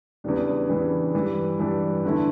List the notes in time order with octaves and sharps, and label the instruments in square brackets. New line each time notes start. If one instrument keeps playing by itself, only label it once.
[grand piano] E2 C#3 E3 G3 D4
E2 C#3 E3 G3 D4
G2 E3 G3
G2 E3 G3
E2 D3 A3 E4